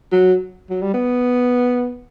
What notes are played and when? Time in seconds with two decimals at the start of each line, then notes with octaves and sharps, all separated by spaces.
0.12 F#3
0.70 F#3
0.82 G3
0.94 B3